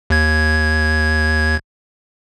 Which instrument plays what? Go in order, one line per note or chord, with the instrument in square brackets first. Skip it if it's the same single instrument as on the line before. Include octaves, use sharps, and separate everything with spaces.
[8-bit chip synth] D#2 G#6